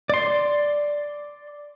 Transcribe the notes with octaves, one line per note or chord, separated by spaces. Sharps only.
D5 C6